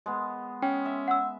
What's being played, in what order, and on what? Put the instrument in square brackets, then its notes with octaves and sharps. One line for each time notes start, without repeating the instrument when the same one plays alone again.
[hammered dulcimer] G#3 B3
[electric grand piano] C#4 [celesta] G5
[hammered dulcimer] E5
[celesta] F#5 E6